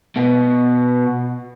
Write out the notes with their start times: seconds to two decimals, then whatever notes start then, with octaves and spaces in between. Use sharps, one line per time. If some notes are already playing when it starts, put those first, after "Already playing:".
0.16 B2